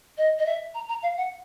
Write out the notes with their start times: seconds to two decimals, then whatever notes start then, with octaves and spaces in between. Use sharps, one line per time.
0.17 D#5
0.39 D#5
0.46 E5
0.74 A#5
0.88 A#5
1.03 F5
1.17 F#5